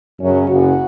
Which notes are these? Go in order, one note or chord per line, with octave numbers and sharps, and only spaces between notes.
F#2 C#3 F#3 C#4
F#1 F#2 C#3 F#4